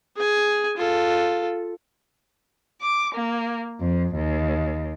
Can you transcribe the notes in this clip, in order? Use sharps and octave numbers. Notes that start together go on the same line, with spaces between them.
G#4 G#5
F4 A4
D6
A#3
F2
D#2